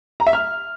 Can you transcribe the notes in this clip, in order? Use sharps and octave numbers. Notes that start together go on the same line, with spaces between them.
A#5
E5
F6